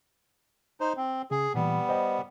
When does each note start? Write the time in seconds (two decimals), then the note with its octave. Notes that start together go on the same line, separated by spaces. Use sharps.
0.81 D#4 C5
0.97 C4
1.31 C#3 G#4
1.55 A#2 E3 G3 B3
1.89 C5 D#5 G5